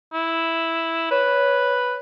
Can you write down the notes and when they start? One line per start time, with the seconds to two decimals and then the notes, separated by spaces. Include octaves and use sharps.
0.13 E4
1.11 B4 C#5